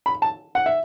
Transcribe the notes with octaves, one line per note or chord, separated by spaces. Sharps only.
B5
A5
F#5
E5